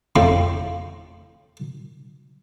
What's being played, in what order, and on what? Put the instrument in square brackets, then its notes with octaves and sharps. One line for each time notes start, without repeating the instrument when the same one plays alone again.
[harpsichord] F2 A2 F3 C4